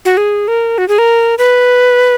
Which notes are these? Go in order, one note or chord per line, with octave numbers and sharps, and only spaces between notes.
F#4
G#4
A#4
F#4
G#4
A#4
B4